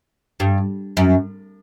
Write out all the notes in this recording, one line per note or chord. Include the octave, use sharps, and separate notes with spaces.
G2
F#2